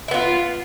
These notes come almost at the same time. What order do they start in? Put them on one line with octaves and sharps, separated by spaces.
E4 B3 F4